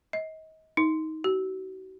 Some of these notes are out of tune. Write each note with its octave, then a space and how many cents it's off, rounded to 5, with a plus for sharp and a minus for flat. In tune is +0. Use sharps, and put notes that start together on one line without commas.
D#5 +30
D#4 +20
F#4 +35